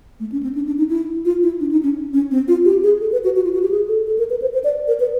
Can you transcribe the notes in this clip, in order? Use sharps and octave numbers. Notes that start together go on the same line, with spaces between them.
A3
C#4
C4
D4
D4
D#4
E4
F4
E4
D4
D#4
C#4
C#4
C4
F4
G4
G#4
A4
B4
F#4
F#4
F4
F#4
G4
G#4
A4
A4
A#4
B4
C5
C5
D5
A#4
B4